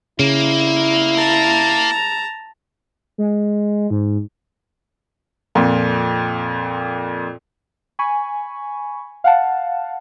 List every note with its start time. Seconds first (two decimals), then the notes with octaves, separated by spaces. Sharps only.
0.19 C#3 A#3 E4
1.17 A5 A#5
3.18 G#3
3.90 G#2
5.55 F2 A#2
7.99 G#5 B5 C#6
9.24 F5 F#5 A5